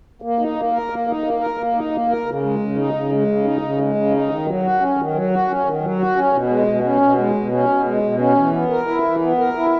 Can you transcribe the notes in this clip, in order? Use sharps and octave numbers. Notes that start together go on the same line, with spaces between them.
A#3
D#4
A#3
A#4
A#3
D#4
A#3
A#4
A#3
D#4
A#3
A#4
C#3
G#3
C#3
D#4
C#3
G#3
C#3
D#4
C#3
G#3
C#3
D#4
D#3
F#3
F#4
C#4
D#3
F#3
F#4
C#4
D#3
F#3
F#4
C#4
B2
G#3
B2
C#4
B2
G#3
B2
C#4
B2
G#3
B2
C#4
E3
B3
A#4
E4
E3
B3
A#4
E4